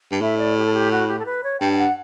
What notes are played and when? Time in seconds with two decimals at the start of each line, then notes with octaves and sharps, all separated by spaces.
0.12 G2
0.21 A2 E5
0.38 D5
0.57 G4
0.66 A4
0.74 G4
0.92 F#4
1.08 G4
1.19 A4
1.26 B4
1.44 C#5
1.61 G2 G5
1.72 G5
1.79 F#5